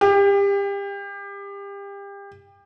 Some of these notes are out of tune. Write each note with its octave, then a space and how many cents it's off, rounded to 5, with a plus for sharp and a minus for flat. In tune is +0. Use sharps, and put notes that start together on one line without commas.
G4 +30